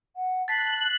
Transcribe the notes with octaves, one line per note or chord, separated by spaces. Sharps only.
F#5
A5 F#6 A6 B6 C7